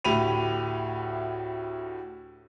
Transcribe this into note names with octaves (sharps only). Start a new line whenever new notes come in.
D2 A2 G4 B5 D#7 F7